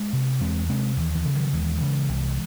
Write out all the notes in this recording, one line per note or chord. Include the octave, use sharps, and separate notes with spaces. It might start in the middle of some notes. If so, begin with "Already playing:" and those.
Already playing: G#3
C3
E2 G#3 C4
C3 G#3 C4
D#2 E3
E3
C#3
D#3 F#3
D#2 E3 G#3
C#3
C2